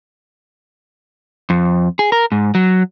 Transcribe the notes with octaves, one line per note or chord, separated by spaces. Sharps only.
F2
G#4
A#4
G#2
F#3